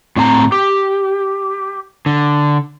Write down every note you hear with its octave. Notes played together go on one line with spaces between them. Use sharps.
A2 C4 G#5 A#5
G4
D3